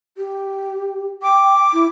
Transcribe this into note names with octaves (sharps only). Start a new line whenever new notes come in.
G4
G5 D6
E4